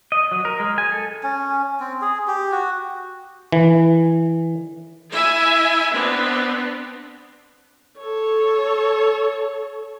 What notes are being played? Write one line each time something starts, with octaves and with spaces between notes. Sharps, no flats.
D#5
F#3
A#4
G#3
G#5
A4
C#4
C4
G#4
G4
F#4
E3
E4 E5 G#5
B3 C4 D4 B4
A4 C#5